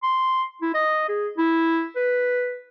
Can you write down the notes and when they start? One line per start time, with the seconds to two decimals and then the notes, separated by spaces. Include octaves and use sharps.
0.03 C6
0.62 E4
0.74 D#5
1.08 G#4
1.38 E4
1.96 B4